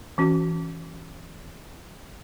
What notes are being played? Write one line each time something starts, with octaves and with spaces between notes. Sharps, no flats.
E3 C#4 F#4